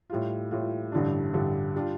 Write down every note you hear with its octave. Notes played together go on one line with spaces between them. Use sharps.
A2 G3 F4
A2 G3 F4
A1 G2 D3 G3 D4
A1 G2 D3 G3 D4
G3 D4 F4